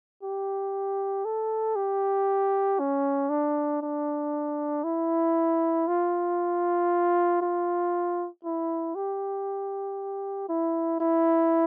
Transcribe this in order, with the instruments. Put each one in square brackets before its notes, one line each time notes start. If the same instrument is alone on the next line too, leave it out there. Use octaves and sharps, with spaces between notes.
[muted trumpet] G4
A4
G4
C#4
D4
D4
E4
F4
F4
E4
G4
E4
E4